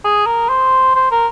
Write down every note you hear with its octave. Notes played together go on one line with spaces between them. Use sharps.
G#4
A#4
C5
C5
A#4